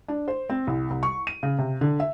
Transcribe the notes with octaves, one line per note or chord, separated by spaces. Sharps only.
D4
C5
C4
C2
C2
C#6
D#7
C#3
C3
D3
E5